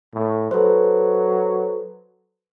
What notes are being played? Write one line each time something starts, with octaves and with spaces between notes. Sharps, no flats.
A2
F#3 A4 B4 C5